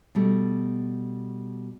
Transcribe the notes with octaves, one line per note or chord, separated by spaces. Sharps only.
B2 G3 A3